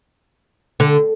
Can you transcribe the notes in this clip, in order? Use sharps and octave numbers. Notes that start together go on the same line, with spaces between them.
D3